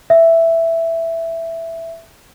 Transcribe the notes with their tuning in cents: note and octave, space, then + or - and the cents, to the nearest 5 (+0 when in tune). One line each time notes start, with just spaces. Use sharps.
E5 +5